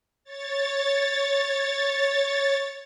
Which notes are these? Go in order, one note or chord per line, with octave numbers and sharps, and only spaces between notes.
C#5 A6